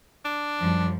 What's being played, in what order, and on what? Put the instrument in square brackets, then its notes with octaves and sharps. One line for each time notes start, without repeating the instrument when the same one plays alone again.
[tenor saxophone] D4
[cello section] F#2 F3 G3